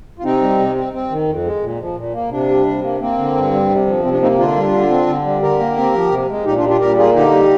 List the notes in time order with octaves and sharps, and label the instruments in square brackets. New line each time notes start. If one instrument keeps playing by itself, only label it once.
[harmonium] F4
C3 C4 D#4
G3
C3
C4
C4
D#3
F2
G#3
A#2
F3
A#2
A#3
C3 D4
G3
C3
A#3
A#3 C4
D3
G2
G3
C3
F3
C3 C4
D4
A#3 C4 D#4
D3 D4 F4
G3
D3
C4
D3
G3
D3 G4 A#4
A#3
C4
F3
C3
G#3
A#2 D#4 G4
D4 F4
G3
D4 F4
A#2 G4 A#4
A#3 F4 G#4
D3 D#4 G4
G3